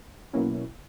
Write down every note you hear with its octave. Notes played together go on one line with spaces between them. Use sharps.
B2 F#3 A#3 C#4 E4